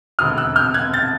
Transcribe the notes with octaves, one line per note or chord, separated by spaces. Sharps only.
E1 D#2 D3 F#3 D#6 F6
E6 F#6
F6 G6
F#6 G#6
G6 A6